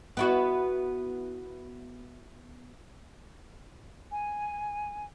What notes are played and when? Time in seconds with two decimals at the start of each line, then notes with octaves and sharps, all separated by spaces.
0.17 B3 E4 F#4
4.10 G#5